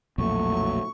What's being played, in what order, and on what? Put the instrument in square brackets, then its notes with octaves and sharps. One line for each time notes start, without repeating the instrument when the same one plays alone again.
[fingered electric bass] B1 F2 A#2 [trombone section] F#3 A3 [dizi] C#6